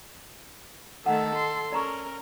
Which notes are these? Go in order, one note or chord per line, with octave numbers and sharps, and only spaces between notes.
D#3 A3 A4 F#5
C6
C#4 A#4 D5 A#5 C#6